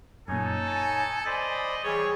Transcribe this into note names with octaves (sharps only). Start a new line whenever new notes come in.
F#2 A#2 D#4 A4 C#5 G#5
A6
C5 D5 D#5 B5
E3 G3 G#4 C#5